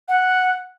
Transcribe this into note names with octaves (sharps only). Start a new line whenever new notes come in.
F#5